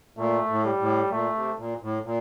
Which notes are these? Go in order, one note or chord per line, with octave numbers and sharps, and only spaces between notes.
A#2 A3
A2
G3
A2
A#2 A3
C3
A#2
A2
A#2